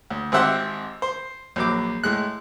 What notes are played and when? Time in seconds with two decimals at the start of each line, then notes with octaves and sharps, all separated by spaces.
0.10 D2
0.32 G#1 C4 G4 E5 F#5 C6
1.02 C5
1.56 A#1 F#3 D6
2.04 A2 G#3 F#6